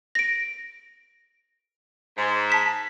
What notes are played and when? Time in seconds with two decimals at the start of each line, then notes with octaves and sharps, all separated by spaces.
0.15 A#6 D7
2.16 G#2
2.50 A5 B6 E7